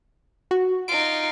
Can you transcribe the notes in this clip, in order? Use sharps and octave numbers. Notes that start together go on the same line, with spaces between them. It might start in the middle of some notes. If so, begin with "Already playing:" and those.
F#4
D#4 F4 D7